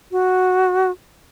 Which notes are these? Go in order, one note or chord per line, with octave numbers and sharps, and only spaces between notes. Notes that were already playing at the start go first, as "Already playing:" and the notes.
F#4